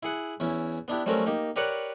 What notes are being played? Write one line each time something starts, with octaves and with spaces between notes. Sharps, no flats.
E4 G#4 F#5
E2 C#4 E4
B3 D4 E4 G4
F#3 G3 A3 C4 C#4 A#4
A#3 D#4 G4
G4 A#4 B4 C#5 D5 F#5